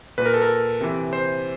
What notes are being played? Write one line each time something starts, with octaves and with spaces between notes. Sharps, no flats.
A#2 B4
A#4
A4
A#4
C3 E3
C5